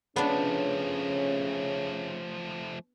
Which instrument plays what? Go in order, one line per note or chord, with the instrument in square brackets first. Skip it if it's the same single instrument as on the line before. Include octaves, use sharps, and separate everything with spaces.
[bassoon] C#3 [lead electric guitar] F3 A3 [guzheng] B3 D4 [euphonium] C#4